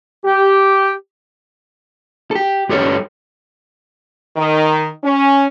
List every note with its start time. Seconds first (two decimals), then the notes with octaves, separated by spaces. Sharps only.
0.25 G4
2.31 G4 A4
2.69 G2 G4 A4 C#5
4.36 D#3
5.04 C#4